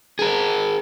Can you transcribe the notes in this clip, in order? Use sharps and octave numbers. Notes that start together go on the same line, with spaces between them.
G#4 A#4